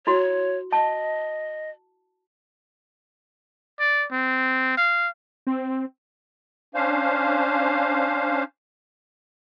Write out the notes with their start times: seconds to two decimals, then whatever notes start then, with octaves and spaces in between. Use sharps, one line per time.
0.07 E4 F#4 C#5 C6
0.73 D#5 A5
3.80 D5
4.12 C4
4.77 F5
5.47 C4
6.75 C#4 D4 C5 F5